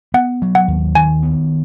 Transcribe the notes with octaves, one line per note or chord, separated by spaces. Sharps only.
B3 F#5
F#3
F#5
D#2
D#3 G#5
B3